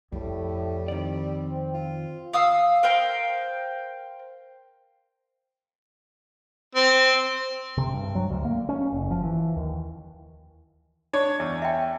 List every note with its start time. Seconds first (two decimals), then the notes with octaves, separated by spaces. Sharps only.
0.12 F2 A2 G3
0.88 D#3 C4 D5
1.74 F4
2.33 F5 D#6 E6
2.83 A#4 C5 F5 G5
6.75 C4
7.77 C3
7.94 G2
8.15 F#3
8.31 D2
8.45 A#3
8.69 C#4
8.93 F#1
9.11 F3
9.24 E3
9.56 D#2
11.13 D4 C#5
11.40 E2
11.62 E5 G5